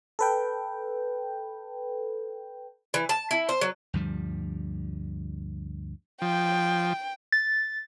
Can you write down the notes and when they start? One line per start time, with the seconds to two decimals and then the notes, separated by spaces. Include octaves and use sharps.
0.19 A4 B4 G5
2.94 E3
3.09 A5
3.31 E4
3.49 C5
3.61 F#3
3.94 D2 G2 F3 G3
6.22 F3 G5
7.32 A6